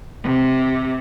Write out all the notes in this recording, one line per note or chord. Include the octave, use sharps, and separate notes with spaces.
C3